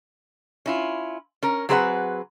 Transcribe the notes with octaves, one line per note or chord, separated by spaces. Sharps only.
C#4 E4 F4
C#4 A#4
F#3 C4 G#4 B4 D#5 F#5